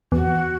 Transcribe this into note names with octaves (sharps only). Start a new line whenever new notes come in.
E2 F#4